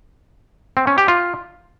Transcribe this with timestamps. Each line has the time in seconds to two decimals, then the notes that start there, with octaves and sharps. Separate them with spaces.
0.77 C4
0.87 C#4
0.98 G4
1.08 F4